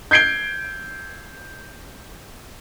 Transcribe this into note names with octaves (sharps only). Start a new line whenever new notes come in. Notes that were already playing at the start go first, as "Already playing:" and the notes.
G6 G#6 C7 D7 G7